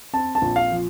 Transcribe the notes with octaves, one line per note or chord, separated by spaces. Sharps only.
C4 A5
A5
A#1
F5
F3